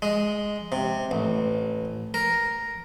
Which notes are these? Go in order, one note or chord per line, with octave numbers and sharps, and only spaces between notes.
G#3
C3
A1
A#4